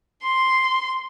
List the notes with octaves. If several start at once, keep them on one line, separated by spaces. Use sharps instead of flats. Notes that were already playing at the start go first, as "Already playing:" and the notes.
C6